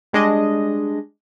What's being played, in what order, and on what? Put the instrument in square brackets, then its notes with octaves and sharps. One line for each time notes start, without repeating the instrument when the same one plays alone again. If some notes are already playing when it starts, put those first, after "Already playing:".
[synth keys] G3 G#3 D4 D#5